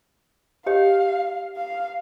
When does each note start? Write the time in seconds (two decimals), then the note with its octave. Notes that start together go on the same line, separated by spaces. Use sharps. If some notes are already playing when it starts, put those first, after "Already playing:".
0.66 G4 C#5 D#5 F5
1.57 F5